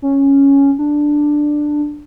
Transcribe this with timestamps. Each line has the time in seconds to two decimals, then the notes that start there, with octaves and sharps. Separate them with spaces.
0.02 C#4
0.79 D4